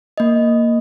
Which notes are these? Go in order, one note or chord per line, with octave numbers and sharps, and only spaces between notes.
A#3 D#5